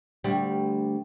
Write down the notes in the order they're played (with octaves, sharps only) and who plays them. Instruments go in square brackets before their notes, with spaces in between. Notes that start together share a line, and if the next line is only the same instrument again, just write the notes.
[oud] D2 G3